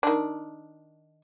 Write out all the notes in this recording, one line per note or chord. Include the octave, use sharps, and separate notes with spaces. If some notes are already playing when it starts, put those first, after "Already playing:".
D#3 D4